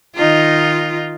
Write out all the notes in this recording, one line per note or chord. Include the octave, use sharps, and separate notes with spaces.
D#3 D#4 F4